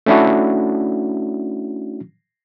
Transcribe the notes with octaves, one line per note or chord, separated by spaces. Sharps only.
A3 C#4 D4 E4 F#4